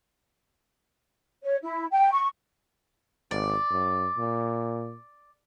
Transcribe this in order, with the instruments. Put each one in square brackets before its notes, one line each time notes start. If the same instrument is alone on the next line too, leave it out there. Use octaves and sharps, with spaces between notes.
[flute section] C#5
E4
G5
C#6
[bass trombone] G#1 [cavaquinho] D5
[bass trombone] F#2
A#2